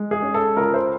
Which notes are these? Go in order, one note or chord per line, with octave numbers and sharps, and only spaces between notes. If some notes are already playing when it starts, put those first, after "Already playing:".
Already playing: G#3
G#4
C#4
A4
C#2 A#4
C5